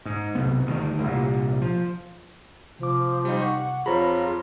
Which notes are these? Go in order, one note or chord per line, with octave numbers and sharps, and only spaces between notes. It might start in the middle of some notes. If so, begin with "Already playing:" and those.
G#2
B1 C3 B3
G1 D2 D3 D#3
C2 A#2
F3
C3 F3 D6
G3 D#4
F#5 C#6
F2 F4 G#4 C5 C#5 A#5 B5